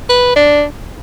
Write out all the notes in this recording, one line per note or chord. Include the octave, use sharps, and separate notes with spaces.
B4
D4